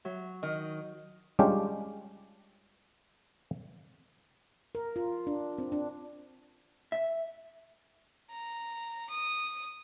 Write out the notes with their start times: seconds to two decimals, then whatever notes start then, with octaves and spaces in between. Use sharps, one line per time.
0.05 F#3 E5
0.43 D#3 D#5
1.39 G3 G#3 C#4 D4 F4 G4
4.75 A#4
4.96 F4
5.27 D4
5.58 C4
5.72 D4
6.92 E5
8.30 A#5
9.10 D#6